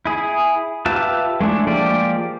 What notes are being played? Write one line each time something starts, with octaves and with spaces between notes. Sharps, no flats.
E4 G#4
F4 G4 B4 E5 A5
G#3 A3 D4 E4
F3 G#3 A#3 G4 D5